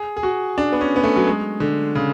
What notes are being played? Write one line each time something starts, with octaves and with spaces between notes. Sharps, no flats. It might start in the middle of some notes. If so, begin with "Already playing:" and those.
Already playing: G#4
G#4
F#4
D4
B3
C#4
B3
A3
F#3
G#3
D3
C#3